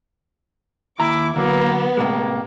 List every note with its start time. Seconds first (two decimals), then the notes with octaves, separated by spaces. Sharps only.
1.00 D#2 E4 A#5 D6
1.36 D3 F#3 A#3 B3
1.97 A2 C3 G#3 A#3